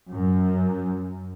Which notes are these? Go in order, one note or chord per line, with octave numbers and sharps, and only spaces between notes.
F#2